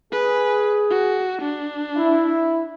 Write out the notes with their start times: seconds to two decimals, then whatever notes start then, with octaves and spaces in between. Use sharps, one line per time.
0.12 G#4 B4
0.91 F#4
1.41 D4
1.95 E4